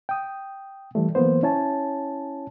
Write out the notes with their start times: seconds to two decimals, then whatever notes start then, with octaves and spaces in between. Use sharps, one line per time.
0.09 G5 D#6
0.95 E3 G3 A3
1.15 E3 F#3 A#3 B3 C5
1.43 C#4 E4 C#5 G#5 A5